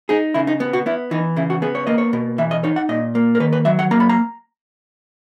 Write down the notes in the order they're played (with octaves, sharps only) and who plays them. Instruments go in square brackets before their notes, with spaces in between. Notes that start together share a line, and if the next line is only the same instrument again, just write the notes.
[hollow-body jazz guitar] D#4 G#4
C#3 E4
D#4
B3
F#4
B3 E4
E3 D#4
C#3 E4
F#4
B3 G#4
C#5
A#3 D#5
C#5
B2
E3 E5
D#5
D#4 C#5
F#5
A#2 D#5
A#3
A#4
D#3 B4
B4
F#3 E5
F#5
A#3 A#5
B5
A#5